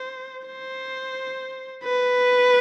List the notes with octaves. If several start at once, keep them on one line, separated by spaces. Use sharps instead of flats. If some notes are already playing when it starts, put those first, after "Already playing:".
Already playing: C5
C5
B4